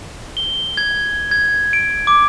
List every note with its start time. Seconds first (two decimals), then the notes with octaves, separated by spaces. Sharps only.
0.37 G7
0.77 G#6
1.31 G#6
1.73 D7
2.07 D6